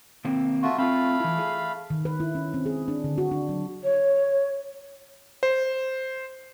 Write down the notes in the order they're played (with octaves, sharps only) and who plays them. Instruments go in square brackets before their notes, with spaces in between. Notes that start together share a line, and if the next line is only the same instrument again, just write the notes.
[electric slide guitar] D#3 A#3 C4
[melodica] A3 F4 F#4
[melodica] A3 F5 B5 [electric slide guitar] C4 F4
[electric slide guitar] E3 E4
G#4
[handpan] D#3
B4
E4
C#4
C4
G#4
D4
D3
F#4
D4
F#3
[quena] C#5
[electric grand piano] C5